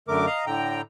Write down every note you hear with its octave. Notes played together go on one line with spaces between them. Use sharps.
F#2 D3 A3 A#4 D6
D#5 F5 A#5
A2 D3 G5 A#5